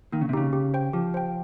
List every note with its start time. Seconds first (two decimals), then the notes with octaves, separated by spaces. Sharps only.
0.12 D#3 A#3
0.21 C#3
0.29 C3
0.33 C#3 D#4 G4
0.53 G4
0.74 C5 G5
0.93 F3 G4
1.14 C5 G5